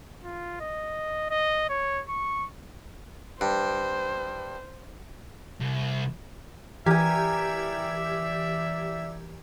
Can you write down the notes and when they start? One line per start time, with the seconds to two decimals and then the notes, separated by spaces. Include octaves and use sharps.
0.24 F4
0.60 D#5
1.30 D#5
1.69 C#5
2.09 C#6
3.41 G2 C5
5.60 C2
6.86 E3 G4 A#4 D5 E5 G#5 G#6